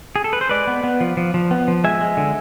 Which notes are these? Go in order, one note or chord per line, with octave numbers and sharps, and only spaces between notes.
G#4
A4
B4
C5
G#3 B4 D5
B3
B3
F3
F3
F3
B3
F3
G#3 E5 G#5
G#3
D3